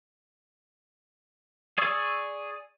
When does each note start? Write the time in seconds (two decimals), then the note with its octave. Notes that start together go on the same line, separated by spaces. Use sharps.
1.78 G#4 D5 C#6 D#6 E6